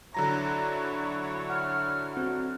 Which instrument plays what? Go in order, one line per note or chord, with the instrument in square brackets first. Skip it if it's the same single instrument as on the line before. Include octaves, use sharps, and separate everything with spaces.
[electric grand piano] D3 F#3 A#6 [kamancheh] E4 C#5 [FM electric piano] A#5 [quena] B5
[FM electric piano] F#5 [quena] F6
[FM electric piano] C4 F#4 [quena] F6